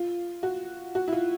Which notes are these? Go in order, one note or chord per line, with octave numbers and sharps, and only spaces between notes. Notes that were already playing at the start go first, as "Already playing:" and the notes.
Already playing: F4
F#4
F#4
E4
F4